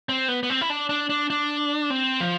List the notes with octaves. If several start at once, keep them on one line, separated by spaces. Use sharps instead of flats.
C4
B3
B3
C4
E4
D4
D4
D4
D4
C4
F3